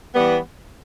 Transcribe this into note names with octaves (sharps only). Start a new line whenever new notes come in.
E3 G3 B3